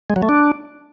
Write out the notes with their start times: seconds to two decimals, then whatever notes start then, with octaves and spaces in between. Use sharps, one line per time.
0.10 G#3
0.16 F#3
0.22 A3
0.29 D4